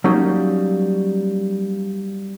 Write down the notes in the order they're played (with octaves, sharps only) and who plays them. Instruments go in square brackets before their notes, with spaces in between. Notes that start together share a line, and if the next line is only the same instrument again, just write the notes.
[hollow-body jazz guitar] F#3 G3 A#3 C#4 D#4